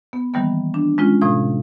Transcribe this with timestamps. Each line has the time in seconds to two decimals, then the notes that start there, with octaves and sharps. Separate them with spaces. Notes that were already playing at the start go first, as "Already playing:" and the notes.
0.13 B3
0.34 D#3 E3 G3 A#3 B3
0.74 D4
0.98 G#3 C#4 F4
1.21 A2 C3 F3 D#6